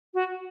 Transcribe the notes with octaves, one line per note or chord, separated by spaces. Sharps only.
F#4